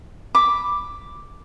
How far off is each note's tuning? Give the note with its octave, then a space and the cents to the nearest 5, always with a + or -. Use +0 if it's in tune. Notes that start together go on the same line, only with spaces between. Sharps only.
B5 +0 D6 +0